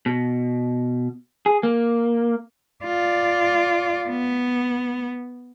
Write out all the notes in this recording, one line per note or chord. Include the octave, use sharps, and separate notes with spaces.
B2
G#4
A#3
F4 D5
B3